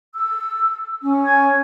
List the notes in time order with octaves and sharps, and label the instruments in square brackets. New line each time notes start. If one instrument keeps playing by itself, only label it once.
[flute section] E6
C#4
[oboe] G#5